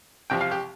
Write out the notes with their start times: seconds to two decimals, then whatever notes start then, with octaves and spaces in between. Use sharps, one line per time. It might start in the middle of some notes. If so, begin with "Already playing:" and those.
0.30 C2 C3 F3 G5
0.41 F5
0.51 G4